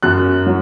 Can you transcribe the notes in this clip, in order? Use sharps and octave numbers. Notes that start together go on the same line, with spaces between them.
F#2 F#6
F#3